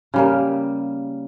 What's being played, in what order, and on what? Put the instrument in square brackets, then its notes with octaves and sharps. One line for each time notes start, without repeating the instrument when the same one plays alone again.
[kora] C#3 G3 A#3